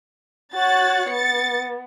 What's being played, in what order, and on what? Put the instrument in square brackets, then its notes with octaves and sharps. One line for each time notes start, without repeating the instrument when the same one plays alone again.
[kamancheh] F#4 C#5 [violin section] F#6 A6
[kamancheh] B3 [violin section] A6 C#7